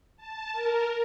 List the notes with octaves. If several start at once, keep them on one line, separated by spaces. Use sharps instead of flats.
A5
A#4